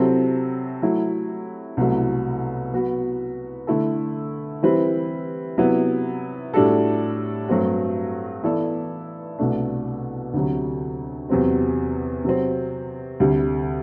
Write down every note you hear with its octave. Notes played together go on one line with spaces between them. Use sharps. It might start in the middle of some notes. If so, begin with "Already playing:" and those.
Already playing: C3 F#3 C4 E4 A4
F#3 A3 E4
C2 B2 F#3 A3 E4
F#3 B3 F#4 B4
D3 A3 E4 A4
E3 G3 C4 E4 B4
C3 F#3 B3 E4
A2 G3 D4 F#4 A4
G2 F#3 A3 C4 F#4
E3 B3 E4 A4 D5
C2 B2 A3 D4
D2 C3 F#3
E2 C3 F#3 C4
C3 F#3 C4
D2 C3 G3